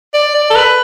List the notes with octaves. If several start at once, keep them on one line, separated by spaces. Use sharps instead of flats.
D5
D5
A4
B4